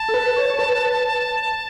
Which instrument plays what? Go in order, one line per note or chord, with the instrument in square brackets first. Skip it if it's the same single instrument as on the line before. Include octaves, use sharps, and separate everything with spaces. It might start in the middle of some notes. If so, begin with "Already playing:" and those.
Already playing: [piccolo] A5
[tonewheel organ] A4
B4
C#5
C#5
B4